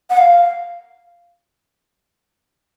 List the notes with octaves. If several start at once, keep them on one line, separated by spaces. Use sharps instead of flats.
F#5
F5